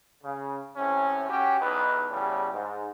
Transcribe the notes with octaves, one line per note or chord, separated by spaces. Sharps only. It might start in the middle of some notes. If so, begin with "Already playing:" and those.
C#3
A2 C3 C#4
C#4 F#4 G4
B1 E2 D#4 B4
E2 A2 C#3 G3
G#2